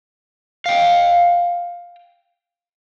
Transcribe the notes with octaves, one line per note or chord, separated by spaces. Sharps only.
F5 G5